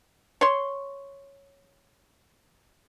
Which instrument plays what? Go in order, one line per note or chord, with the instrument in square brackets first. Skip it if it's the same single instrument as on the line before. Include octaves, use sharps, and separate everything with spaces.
[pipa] C#5 C6